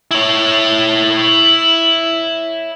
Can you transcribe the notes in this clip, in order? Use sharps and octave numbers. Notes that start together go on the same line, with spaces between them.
E4 C#5